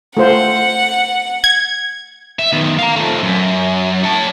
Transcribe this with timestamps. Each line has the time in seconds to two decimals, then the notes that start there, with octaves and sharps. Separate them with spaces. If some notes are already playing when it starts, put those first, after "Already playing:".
0.17 A3 F4 C5 F#5
1.44 G#6
2.39 E5
2.52 D#3 B3
2.78 F5 A#5
2.96 F3 A3
3.23 F#2
4.04 C#5 A5